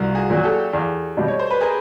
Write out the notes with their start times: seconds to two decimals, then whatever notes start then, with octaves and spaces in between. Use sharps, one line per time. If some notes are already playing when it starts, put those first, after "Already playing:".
Already playing: C2 F4 F#4
0.15 F#4 G#4
0.30 A#2 F#3
0.37 G#4
0.44 G4 A4
0.73 E2
1.17 B2 G3
1.28 C#5
1.39 C5
1.51 B4
1.61 G#4 A#4